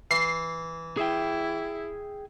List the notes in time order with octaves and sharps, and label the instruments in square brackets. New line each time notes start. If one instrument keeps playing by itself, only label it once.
[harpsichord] E3 [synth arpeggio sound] C7
[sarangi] E4 [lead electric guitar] G#4 G5